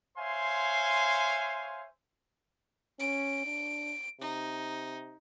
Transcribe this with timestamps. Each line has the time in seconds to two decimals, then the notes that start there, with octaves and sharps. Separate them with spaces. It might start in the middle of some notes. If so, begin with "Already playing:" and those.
0.18 C5 C#5 E5 F5 G#5 C6
3.00 C#4 D7
3.45 D4
4.21 C3 D#4